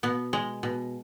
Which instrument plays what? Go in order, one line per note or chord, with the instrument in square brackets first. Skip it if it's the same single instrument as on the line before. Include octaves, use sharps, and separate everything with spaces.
[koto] B2 B3
G#3
B2